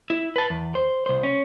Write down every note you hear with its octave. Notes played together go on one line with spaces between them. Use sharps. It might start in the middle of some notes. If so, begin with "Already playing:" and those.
E4
B4 A5
E2
C5
C2 C5
C#4